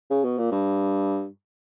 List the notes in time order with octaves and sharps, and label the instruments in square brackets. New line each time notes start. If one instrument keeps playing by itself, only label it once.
[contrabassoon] C#3
B2
A#2
G2